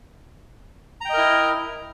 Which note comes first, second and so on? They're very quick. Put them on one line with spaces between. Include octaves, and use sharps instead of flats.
A#5 G5 D#5 A#4 E4